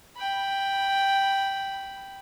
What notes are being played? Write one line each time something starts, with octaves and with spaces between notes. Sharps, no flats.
G5 B5